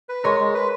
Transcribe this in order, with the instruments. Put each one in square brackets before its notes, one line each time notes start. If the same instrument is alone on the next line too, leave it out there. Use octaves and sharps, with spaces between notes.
[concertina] B4
[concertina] G#3 [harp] A#4 C#5
[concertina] G#3
B4